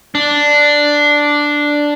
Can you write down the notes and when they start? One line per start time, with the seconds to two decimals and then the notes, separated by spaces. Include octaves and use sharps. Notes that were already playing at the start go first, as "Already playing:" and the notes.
0.15 D4